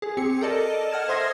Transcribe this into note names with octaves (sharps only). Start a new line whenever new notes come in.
G#4
C4 G4 G#4 C#7
A4 A#4 D5 D#5 A5
F#5 F6 G#6 E7
C5 E5 C6 D#6 G#6 A#6